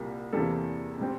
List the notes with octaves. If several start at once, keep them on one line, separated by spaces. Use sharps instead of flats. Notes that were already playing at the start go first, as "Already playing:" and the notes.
Already playing: C2 A#2 G3 A#3
E2 C3 E3 G3 A#3 A4
B2 G3 C4